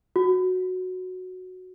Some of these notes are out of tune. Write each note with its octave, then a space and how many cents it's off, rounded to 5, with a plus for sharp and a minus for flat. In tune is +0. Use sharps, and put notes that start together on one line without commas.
F#4 -5